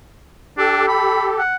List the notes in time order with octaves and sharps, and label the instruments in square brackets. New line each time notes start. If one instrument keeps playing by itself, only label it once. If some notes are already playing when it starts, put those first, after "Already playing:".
[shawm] D4 [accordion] G4 A4
[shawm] B5
F#5